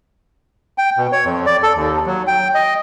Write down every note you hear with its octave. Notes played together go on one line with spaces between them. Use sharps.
G5
B2
C#5
F2
D5
A4
D#2
F#3
G5
D#5